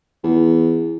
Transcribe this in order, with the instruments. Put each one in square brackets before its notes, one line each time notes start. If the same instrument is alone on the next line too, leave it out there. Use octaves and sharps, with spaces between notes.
[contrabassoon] E2